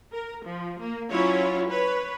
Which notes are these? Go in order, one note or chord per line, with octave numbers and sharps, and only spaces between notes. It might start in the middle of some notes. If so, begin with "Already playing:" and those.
A#4
F3
A#3
F#3 C#4 E4 F4 C#5
B4 C#5